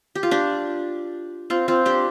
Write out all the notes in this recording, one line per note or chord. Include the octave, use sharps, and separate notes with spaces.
G4
F4
D4 G4
C4 F4
C4 F4
D4 G4